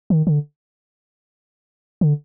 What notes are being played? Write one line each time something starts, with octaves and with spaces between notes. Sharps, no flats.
D#3
D3
D3